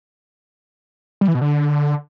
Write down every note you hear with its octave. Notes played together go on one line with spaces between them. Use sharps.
G3
E3
B2
D3